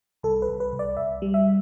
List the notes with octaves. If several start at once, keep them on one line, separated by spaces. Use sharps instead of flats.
C2 A4
B4
C2
B4
C2
D5
C2 E5
G3
E5